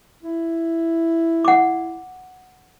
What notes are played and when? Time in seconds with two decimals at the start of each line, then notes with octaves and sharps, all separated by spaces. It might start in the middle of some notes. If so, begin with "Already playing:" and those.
0.23 E4
1.45 F#5 D6